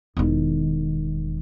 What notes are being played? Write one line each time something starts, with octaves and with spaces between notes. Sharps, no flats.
E1 D#3